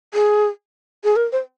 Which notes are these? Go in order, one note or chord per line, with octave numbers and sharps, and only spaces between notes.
G#4
G#4
A#4
C5